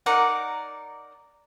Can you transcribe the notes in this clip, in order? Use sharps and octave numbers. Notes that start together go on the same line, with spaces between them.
D#4 A#4 D5 F#5